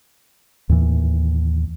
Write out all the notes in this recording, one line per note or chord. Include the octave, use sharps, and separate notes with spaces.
D#2 A2 E3